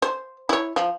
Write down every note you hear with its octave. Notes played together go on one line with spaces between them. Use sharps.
C5
E4 C#5
F3